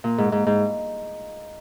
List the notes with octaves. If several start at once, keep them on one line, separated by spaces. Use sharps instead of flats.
A#2
G#2
G#2
G#2